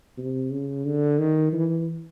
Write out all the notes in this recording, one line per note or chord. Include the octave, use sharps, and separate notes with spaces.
C3
C#3
D3
D#3
E3